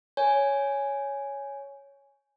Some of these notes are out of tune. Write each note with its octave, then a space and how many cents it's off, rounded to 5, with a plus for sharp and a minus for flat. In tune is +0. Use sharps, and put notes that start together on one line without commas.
C#5 +5 G#5 +0